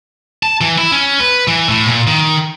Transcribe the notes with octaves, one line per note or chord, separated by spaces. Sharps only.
A5
E3
E4
C#4
B4
E3
A2
A#2
D#3